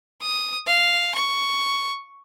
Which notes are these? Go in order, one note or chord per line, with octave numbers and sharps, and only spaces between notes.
D#6
F5
C#6